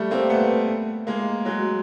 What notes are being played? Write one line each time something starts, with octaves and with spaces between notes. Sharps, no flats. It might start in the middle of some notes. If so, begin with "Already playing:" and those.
Already playing: G3 A3
A#3 C4
A3 B3
G#3 A#3
F#3 G#3